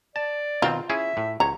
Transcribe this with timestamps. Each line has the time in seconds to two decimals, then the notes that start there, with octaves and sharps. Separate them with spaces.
0.16 D5 A5
0.62 B2 D#3 C4 F4
0.90 C#4 E4 G#4 E5
1.17 A2
1.40 C#2 C#5 A#5